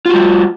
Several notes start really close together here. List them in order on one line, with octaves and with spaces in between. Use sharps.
F4 F#4 G3